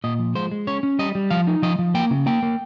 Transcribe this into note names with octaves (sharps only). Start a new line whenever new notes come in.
A#2 D#5
F3
G#3 C5
G#3
C#4 C#5
C#4
G3 D#5
G3
F3 F5
D#4
F3 D#5
F3
A#3 G5
C#3
A#3 G5
A#3